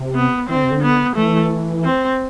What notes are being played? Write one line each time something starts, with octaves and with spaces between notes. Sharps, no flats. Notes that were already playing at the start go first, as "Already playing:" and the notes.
Already playing: C3
B3
E3 C4
D3
C3
D3
B3
E3 A3
C4